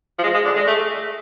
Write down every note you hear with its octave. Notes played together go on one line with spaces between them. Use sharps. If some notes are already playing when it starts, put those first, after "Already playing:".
F3
G#3
G#3
D3
G#3
A3